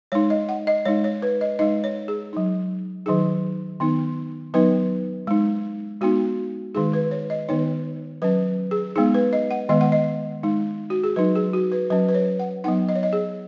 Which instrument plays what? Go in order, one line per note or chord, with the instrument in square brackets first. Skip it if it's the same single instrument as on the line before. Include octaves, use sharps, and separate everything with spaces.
[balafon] G#3 D#4 C#5
D#5
F#5
D#5
G#3 D#4 C#5
C#5
B4
D#5
G#3 D#4 D#5
C#5
G#4
F#3 D#4
D#3 F#3 D#4 G#4
D#3 B3 D#4
F#3 B3 D#4 B4
G#3 D#4
G#3 B3 D#4 F#4
D#3 G#3 D#4 G#4
B4
C#5
D#5
D#3 B3 D#4 C#5
F#3 C#4 B4
G#4
G#3 B3 D#4 G#4
B4
D#5
F#5
D#3 G#3 B3 D#5
F#5
D#5
G#3 D#4
F#4
G#4
F#3 D#4 B4
G#4
F#4
B4
F#3 C#4 B4
B4
C#5
F#5
F#3 B3 D#4 F#5
D#5
C#5
D#5
G#4